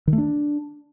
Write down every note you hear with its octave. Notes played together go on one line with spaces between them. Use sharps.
D#3
A3
D4